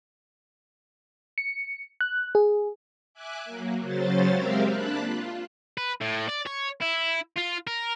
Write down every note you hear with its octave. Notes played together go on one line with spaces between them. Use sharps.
C#7
F#6
G#4
E5 G#5 D6 F#6
F#3 A#3
C#3 F#3 C#4 C5 A6
G#3 C4 G4 A#4 E5 F5
A#3 D4 A5 B5 F#6
F4
B4
A2
D5
C#5
E4
F4
A#4